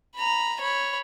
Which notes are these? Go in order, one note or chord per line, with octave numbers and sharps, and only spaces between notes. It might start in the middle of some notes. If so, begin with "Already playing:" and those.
A#5 B5
C#5 B5